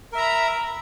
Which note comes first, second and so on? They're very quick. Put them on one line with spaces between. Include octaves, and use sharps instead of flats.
A#4 E5 A#5 B5